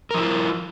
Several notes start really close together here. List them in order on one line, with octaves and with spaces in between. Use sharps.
A#4 F3 E4 F4